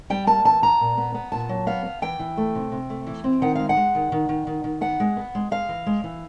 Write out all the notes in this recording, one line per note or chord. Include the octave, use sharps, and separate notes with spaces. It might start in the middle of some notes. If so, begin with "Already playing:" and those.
G3 G5
A#3 A5
E3 A5
B3 A#5
A#2
B3
B3
A#2 A5
F#3
B3 F5
B3
E3 G5
E3
A3
C3
C3
A3
E3
C4
D#3 F#5
G#3 F5
F#5
G#3
D#3
D#3
D#3
D#3
D#3
B3 F#5
G#3
B3
G#3
G#3 F5
E3
G#3
E3